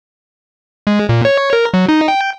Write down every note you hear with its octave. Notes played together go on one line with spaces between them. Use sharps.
G#3
A#2
C#5
A#4
F#3
D#4
G5